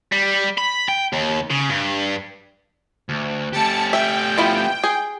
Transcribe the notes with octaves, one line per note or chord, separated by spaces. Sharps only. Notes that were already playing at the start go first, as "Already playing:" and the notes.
G3
B5
G5
D#2
C#3
G2
D2
A3 G4 A5 C#7
E5 G5
B3 E4 F4
G#4